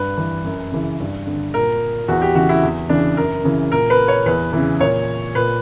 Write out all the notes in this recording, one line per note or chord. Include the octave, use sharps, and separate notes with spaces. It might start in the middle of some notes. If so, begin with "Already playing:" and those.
Already playing: G2 B4
E3
F#2
C#3 E3
G2
D3
A#2 A#4
E2 F#4
G4
C#3 E3 F#4
E4
E2
C#3 E3 D4
F#2 A#4
C#3 E3
A#2 A#4
B4
C#5
E2 B4
C#3 E3
A#2 C#5
A#2 B4